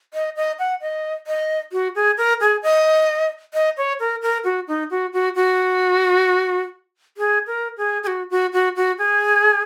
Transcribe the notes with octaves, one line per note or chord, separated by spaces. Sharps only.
D#5
D#5
F#5
D#5
D#5
F#4
G#4
A#4
G#4
D#5
D#5
C#5
A#4
A#4
F#4
D#4
F#4
F#4
F#4
G#4
A#4
G#4
G#4
F#4
F#4
F#4
F#4
G#4